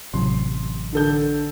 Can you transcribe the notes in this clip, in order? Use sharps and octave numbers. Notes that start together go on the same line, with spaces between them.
A1 C3 F#3 C6
D3 A4 G6